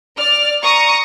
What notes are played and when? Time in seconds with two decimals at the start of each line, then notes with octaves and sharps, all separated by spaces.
0.17 D5 F6
0.62 A#5 C#6 D#6